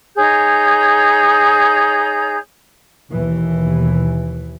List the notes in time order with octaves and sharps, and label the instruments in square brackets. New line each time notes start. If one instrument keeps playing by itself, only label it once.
[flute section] D#4 G#4 C#5 G6
[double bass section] D#2 B2 E3